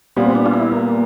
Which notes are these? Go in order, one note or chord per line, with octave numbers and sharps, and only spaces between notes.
A#2 G3 B3 C4
D4
F4
E4
A#3